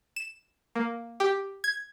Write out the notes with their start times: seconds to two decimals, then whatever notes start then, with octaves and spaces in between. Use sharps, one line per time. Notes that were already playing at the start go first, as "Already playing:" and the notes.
0.16 E7
0.75 A#3
1.20 G4
1.64 G#6